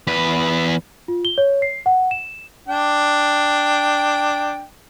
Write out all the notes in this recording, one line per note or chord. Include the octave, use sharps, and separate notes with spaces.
E2 B4
F4
G7
C#5
C7
F#5
E7
D4 G5